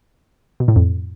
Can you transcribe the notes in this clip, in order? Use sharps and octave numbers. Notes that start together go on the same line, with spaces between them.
B2
A2
F2